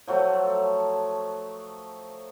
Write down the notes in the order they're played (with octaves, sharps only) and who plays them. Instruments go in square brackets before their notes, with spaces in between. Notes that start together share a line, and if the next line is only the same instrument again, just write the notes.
[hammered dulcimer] F3 F#3 A3